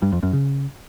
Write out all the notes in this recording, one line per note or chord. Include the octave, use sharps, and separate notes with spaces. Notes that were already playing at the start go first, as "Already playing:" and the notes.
G2
F2
F#2
C#3